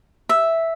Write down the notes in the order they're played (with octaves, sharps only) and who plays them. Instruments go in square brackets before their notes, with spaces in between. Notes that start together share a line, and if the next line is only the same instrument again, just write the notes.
[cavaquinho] E5